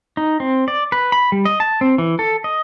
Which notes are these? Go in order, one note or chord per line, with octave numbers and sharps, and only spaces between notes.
D#4
C4
D5
B4
B5
G3
D#5
A5
C4
E3
A4
D#5